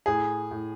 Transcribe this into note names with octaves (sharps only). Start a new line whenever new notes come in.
A2 G#4
A2